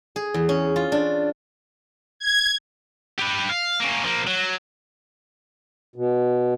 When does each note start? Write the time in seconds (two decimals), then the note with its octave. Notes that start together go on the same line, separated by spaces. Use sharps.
0.16 G#4
0.34 E2
0.49 C#4
0.76 F4
0.92 D4
2.19 G#6
3.18 G4 B4
3.49 F5
3.80 A#3 C#4
4.04 F3 A#3
4.27 F#3
5.96 B2